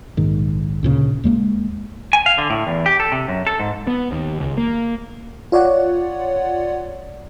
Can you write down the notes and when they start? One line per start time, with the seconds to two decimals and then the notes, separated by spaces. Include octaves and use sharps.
0.17 A#1 G#2 D#3
0.83 D2 A#2 C#3
1.24 D#2 G#3 A#3
2.13 G#5
2.26 F5
2.38 D3
2.50 A2
2.67 E2
2.86 G4
3.00 A4
3.12 C3
3.28 F#2
3.47 A4
3.60 G#2
3.87 B3
4.12 D#2
4.40 C#2
4.57 A#3
5.52 F4 C#5 D5 F#5